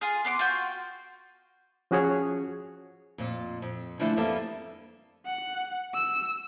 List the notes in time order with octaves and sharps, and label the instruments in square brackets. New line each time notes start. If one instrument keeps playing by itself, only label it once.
[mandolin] F4 G#4
B3 C6 D6
F4 F#4 G5
[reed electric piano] F3 C#4 F#4 G#4 C#5
[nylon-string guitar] F2 A#2 F4
F2
D3 E3 F3 A3 D4 E4
F2 G3 A#3 B3 A4 E5
[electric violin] F#5
E6